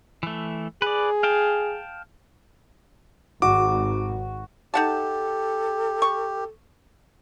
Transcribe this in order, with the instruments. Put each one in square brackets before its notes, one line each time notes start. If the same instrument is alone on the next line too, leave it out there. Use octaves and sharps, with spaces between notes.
[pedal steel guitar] E3 A3
[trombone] G#4 [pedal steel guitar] B4 D5
[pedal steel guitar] F5 G5 A5
[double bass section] G#1 [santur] F#4 [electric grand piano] D6
[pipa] D#4 F#5 A5 [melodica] G4 [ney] A4
[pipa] C#6